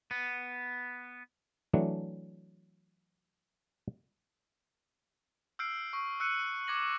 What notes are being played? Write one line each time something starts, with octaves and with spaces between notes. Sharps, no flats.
B3
E3 F#3 A3 D4
E6 F6 G6 C7 D7
C#6
E6 F#6 C#7 D#7
D6 G#6 A#6 F#7